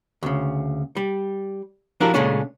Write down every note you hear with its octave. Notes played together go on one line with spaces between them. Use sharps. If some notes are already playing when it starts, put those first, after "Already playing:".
D2 C#3
G3
F3 D4 E4 F#4 G4 A#4
A#2 C#3 G#3 A3 C#4 D4